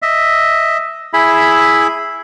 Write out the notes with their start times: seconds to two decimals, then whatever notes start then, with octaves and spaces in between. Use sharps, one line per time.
0.02 D#5 E5
1.13 E4 G#4 E5 B5